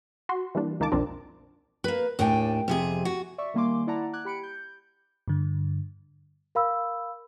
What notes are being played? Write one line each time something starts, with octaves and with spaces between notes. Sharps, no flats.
F#4 C6
E3 G3 A#3 D4
C#2 D#3 A#3 A#4 A5 D6
B1 F2 A#2 C4 D4 A#4
A#3 B4
D#2 A2 D4 G5 G#5
F2 C3 G#4
F#4
D5 E5 C#6
D#3 G3 A#3 G#5 C6 D6
E4 D5 F#5 A5 A#5
D6 F#6 G#6
G4 B5 C#7 D7
G6
G2 D3
A#4 F5 B5 E6